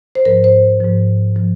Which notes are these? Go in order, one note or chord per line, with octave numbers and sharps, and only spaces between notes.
C5
G#2 F3 A#4
C5
G#2 F3
F3